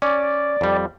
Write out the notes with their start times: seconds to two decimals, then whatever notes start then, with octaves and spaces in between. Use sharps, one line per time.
0.02 C#4 D5
0.61 F2 G3